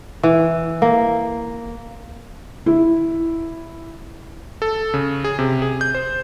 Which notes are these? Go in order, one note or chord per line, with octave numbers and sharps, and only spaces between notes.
E3
A#3
E4
A4
C#3
G#4
C3
G#4
G6
C5